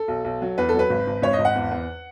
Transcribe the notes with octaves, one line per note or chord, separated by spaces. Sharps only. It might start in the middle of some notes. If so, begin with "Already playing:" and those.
Already playing: A4
B1
B1
F#3
E2 B4
A4
F#3 B4
G#1
G#1
G#1 C#5
D#5
G#1
F#5
E2
E2